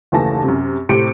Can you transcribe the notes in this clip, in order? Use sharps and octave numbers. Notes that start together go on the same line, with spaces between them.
F#1 D#2 E3 A3 A5 A#6
F#2 C3
A2 C3 C4 G4 C#7 D7